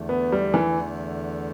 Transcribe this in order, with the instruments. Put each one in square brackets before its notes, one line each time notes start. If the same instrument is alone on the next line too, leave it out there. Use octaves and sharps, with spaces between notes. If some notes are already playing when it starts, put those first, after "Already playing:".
Already playing: [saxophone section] E2 D3 A3
[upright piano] B3
G3
E3